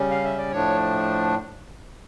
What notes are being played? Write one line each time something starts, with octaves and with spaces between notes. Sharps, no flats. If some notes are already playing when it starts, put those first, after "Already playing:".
Already playing: C#3 G3 C#4
F5
E5
D5
A2 F3 A3 D4 C#5